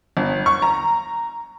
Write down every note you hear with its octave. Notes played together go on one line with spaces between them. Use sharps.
G1
C#6
A#5